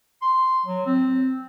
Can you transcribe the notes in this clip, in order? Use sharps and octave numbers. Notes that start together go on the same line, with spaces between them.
C6
F#3
C4